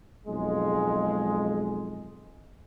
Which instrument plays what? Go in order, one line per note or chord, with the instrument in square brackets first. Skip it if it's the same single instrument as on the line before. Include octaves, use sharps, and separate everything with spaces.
[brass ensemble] B1 F2 G#3